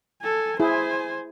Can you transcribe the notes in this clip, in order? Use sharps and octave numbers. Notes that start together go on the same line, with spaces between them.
A4 G#5
E4 G#4 C5 G#5